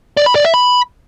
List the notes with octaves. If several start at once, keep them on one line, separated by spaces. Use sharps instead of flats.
D5
B5
D5
E5
B5